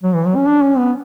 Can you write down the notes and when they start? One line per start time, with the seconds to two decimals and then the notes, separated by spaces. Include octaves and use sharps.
0.03 F#3
0.14 E3
0.26 F#3
0.36 C#4
0.48 D4
0.63 C#4
0.78 B3